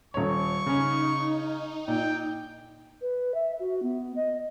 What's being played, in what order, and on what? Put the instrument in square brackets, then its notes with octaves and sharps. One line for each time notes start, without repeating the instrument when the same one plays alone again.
[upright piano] D#1 C#5 [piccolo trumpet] C#6
[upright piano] C#3 C#4 [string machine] D#4
[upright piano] A#2 [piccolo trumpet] G5
[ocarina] B4
E5
F#4
B3
D#5